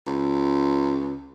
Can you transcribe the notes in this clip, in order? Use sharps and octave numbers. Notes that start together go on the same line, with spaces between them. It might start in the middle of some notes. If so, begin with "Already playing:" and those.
C#2